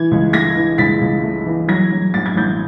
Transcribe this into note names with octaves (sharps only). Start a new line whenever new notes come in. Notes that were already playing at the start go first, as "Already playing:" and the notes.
Already playing: E3 G#6
C#2
A3 G#6 A#6
E3
C#2 A6 B6
C#2
A3
E3
F#3 G#6 A#6
F#3
A1 A6
G#6
A1 G6 A6